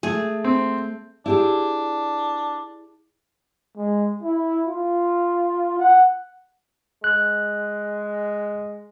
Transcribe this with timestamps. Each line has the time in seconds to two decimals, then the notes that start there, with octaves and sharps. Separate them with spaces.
0.03 A3 G#4
0.44 C4
1.26 D4 E4 G4 G#4
3.77 G#3
4.23 E4
4.67 F4
5.79 F#5
7.04 G#3 F#6